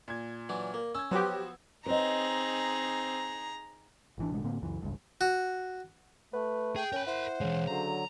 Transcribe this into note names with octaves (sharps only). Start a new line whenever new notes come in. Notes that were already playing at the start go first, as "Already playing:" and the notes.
A#2 G#6
E3 F#3 D4
A#3
C#4 E6 G#6
F3 F#3 B3 F#4 G4 B4 C5
C4 D#4 G#4 B4 C#5 D#5 A#5
G#1 E3 D4
A1 B2 D3 G#3
A2 D3 A#3 C4
C#2 F#2 E3
G#1 C#2 G2
F#4
A3 B4
G#4 G5
C#4 A#4 B5
E4 C5 F#5
C#3 E3 G#3
D3 F#3 A#5